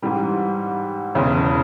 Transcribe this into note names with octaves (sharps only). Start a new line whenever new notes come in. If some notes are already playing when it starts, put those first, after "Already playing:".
G#2 E3 G3
E1 E2 C#3